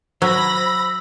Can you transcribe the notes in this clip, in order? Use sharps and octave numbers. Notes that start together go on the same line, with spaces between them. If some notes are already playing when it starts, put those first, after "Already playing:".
F#3 C5 B5 E6 A#6